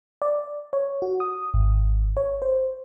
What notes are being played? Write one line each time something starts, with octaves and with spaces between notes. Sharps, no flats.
D5
C#5
F#4
D#6
G#1
C#5
C5